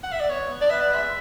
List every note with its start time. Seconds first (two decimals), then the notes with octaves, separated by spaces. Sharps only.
0.03 F#5
0.12 E5
0.20 D5
0.28 B3 C#5
0.50 B3
0.61 D5
0.70 B4 E5
0.80 D5
0.93 G#3 E5